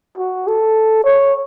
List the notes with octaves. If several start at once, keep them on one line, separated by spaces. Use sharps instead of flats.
F#4
A4
C#5